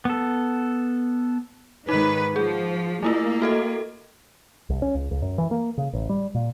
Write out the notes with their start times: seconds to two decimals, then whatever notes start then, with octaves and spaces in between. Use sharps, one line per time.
0.05 B3 A4
1.89 G#2 D#3 D#4 B4
2.36 F3 G#4
3.03 A3 A#3 E4 F4
3.42 F#4 A4 D#5
4.70 C2
4.82 C#4
4.95 C#2
5.11 C#2
5.22 F#2
5.38 E3
5.51 A#3
5.78 C#3
5.93 A1
6.09 G3
6.35 A#2